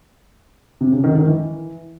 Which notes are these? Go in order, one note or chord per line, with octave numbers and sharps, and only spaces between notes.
C3
C#3
D#3
D#3
E3